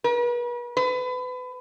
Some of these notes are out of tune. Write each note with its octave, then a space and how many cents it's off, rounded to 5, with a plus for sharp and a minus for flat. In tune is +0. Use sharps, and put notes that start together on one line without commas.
B4 -40
B4 +30